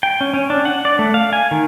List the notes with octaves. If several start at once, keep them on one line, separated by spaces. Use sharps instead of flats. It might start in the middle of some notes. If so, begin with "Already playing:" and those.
G5
C#4
C#4
D4
F#5
D5
A3
F5
G#5
D#3